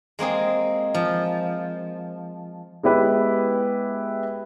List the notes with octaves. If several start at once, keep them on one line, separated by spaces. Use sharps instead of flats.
G#3 A#3 C4 G#4
F3
G#3 B3 E4 G4 B4